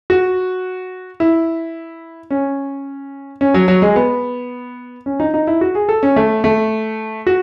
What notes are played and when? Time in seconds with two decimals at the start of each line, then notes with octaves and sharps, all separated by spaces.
0.10 F#4
1.20 E4
2.31 C#4
3.41 C#4
3.54 F#3
3.68 F#3
3.82 G#3
3.96 B3
5.06 C#4
5.20 D#4
5.34 D#4
5.47 E4
5.61 F#4
5.75 G#4
5.89 A4
6.03 C#4
6.16 A3
6.44 A3
7.27 F#4